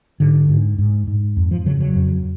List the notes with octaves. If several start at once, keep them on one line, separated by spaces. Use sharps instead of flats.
G#2 D3
G#2
G#2
G#2
F2
F3
C#3 F#3
F#3
F2